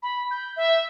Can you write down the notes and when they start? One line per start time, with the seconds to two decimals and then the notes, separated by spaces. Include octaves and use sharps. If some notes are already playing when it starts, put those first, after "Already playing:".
0.02 B5
0.31 G6
0.56 E5